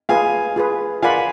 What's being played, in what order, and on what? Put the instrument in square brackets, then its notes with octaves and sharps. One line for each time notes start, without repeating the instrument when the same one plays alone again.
[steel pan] F4 G#4 B4 [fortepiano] F5 G#5
[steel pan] F4 G#4 B4
[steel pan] F4 A#4 D5 F#5 B5 [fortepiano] F5 G#5